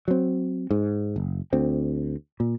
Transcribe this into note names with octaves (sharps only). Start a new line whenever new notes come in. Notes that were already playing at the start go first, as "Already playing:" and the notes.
F#3 C4
G#2
F#1
D2 C4
A#2